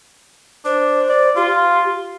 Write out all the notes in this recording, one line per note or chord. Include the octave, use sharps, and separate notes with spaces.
D4 C5
D5
F4 G4